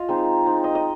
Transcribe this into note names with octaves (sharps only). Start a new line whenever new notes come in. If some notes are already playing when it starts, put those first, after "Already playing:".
Already playing: F4 D#5 F5
G#3 C4 D#4
G#3 C4 D#4
D#5
D#5